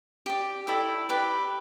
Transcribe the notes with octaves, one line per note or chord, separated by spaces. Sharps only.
G4 D5
E4 A4 D5 G5
G4 B4 D5